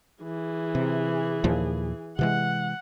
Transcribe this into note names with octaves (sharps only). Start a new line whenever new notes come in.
E3 G#4
C3
D#2 A#2 F3
C3 E3 G#3 F#5